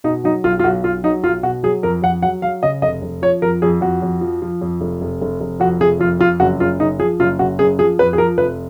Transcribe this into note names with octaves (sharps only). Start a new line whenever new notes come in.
B2 D#4
F#3 D#4
B1 F4
F4
B1 F#4
B1 F4
F#3 D#4
B1 F4
B2 F#4
F#3 G#4
F2 A#4
F2 F#5
F#3 F#5
F#3 F5
C#3 D#5
F1 D#5
F1
F3 C#5
F2 A#4
F2 G#4
F2 F#4
F2
F3
F3
F2
F1
F1
F1
F1
F2 F#4
F1 G#4
F2 F4
F2 F4
F#1 F#4
F#1 F4
F#1 D#4
F3 G#4
F#1 F4
F#1 F#4
F#1 G#4
F3 G#4
F2 B4
G#4
F3 A#4
F1 B4